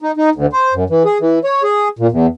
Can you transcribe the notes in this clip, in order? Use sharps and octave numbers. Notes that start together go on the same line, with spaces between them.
D#4
D#4
D2
C5
F#2
E3
G#4
E3
C#5
G#4
A#2
E2